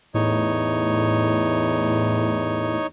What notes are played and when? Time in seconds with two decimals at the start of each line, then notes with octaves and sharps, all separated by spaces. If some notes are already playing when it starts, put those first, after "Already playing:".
0.14 E2 A2 D#4 C#5